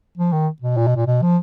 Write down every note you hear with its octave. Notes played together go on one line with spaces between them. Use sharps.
F3
D#3
B2
A#2
B2
A#2
B2
F3